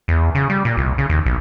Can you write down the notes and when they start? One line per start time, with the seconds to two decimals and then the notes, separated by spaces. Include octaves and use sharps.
0.08 E2
0.35 C#3
0.50 G3
0.65 A#2
0.77 C2
0.98 C#3
1.09 D#2
1.26 B1